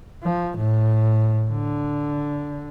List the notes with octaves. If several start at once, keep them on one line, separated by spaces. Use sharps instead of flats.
F3
A2
D3